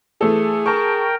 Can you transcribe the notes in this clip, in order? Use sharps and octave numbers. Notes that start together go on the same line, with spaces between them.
E3 A3 G#4 A4
A#4 G5 A5 C#6